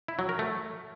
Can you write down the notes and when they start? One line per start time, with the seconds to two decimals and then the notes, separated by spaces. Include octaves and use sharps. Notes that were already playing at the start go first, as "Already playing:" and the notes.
0.08 E4
0.19 F#3
0.29 A#4
0.39 A3